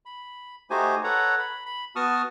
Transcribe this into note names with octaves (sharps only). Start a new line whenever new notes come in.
B5
A3 D#4 F#4 G4 C5 G#5
A4 B4 C#5 F#5 A#5
B5
B5
B3 F#4 A5 C#6 D#6 F6